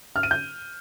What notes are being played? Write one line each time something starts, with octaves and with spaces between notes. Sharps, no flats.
F6
D#7
G6